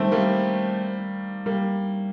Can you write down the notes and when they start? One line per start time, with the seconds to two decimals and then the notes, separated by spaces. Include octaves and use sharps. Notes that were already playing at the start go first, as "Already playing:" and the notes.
Already playing: D#3 G3 A3 C4
0.12 G3 A#3
1.46 G3 A#3